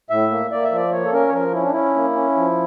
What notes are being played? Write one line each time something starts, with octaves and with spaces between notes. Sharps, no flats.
A2 E5
A#3
A#3 D5
E5
F3 D5
A#3 C#5
A4
C#4 A#4
C#5
F3 A#4
C#4 E4
D4
C#4 E4
A#3
C#4
F3